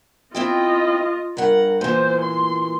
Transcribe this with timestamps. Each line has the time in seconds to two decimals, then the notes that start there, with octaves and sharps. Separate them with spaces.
0.35 C4 E4 F4 D#5 G5
1.37 G2 A#4 F#5
1.81 A#2 E3 C5
2.21 C6